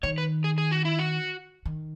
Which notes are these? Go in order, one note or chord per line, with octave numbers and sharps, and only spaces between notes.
D#3 C#5
B4
G#4
G#4
F#4
E4
F#4
D#3